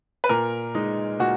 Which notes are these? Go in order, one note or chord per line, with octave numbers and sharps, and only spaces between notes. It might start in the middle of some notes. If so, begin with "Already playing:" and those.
B4
A#2 A#4
G#3 D#4
A#2 F#4